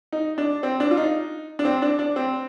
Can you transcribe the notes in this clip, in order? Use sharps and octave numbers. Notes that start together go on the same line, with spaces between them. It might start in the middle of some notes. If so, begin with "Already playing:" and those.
D#4
D4
C4
D4
F4
D#4
D4
C4
D4
D4
C4